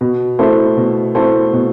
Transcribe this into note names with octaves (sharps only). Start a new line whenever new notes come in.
B2
A3 E4 A4 C5
B2
A3 E4 A4 C5
B2